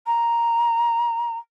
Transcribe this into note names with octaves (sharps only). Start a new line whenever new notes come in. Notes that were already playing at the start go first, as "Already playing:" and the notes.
A#5